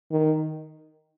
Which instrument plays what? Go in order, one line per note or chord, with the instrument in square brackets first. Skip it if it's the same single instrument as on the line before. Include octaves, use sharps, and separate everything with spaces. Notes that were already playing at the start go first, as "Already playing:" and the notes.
[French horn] D#3